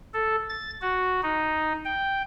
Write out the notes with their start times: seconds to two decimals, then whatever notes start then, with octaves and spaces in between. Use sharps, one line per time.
0.14 A4
0.49 A6
0.81 F#4
1.23 D#4
1.85 G5